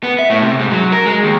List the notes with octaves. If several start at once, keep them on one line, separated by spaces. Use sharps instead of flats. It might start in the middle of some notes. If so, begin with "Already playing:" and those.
B3
E5
A2
C3
G#2
F#3
A#4
G#3
D#2